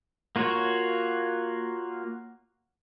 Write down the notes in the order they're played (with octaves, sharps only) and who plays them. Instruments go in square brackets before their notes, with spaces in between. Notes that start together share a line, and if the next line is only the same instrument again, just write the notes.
[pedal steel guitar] A#3 F4 F#4 C#5